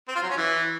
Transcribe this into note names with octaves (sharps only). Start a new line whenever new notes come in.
C4
F4
F#3
C#4
E3